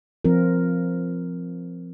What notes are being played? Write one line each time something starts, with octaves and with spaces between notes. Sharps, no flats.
F3 C4 F4 A#4